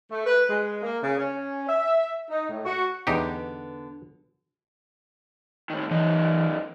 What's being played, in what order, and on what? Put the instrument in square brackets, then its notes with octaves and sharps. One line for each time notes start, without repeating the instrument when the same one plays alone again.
[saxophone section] A3
B4
G#3
A#3
C#3
C#4
E5
D#4
A2
F#4
[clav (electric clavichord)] E2 D#4 G4 [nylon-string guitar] D3 B3
[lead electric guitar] A2 D#3
[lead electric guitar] F#2 D#4 [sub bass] E3